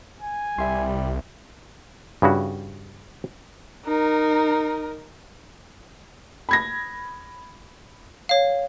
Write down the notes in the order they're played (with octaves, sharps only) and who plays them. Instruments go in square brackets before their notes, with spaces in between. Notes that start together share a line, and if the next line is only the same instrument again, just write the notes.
[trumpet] G#5
[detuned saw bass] C2 [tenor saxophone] G3 [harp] E5 C6
[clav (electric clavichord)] G2 C#3 E4 F#4
[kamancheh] D#4 A#4
[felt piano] B5 G#6 A#6
[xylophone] C#5 F5